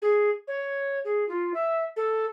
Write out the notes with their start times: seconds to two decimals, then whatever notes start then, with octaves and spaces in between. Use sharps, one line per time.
0.02 G#4
0.48 C#5
1.05 G#4
1.29 F4
1.54 E5
1.96 A4